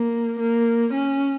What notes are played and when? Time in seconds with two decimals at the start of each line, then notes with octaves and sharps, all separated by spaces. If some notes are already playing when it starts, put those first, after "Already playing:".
Already playing: A#3
0.39 A#3
0.93 C#4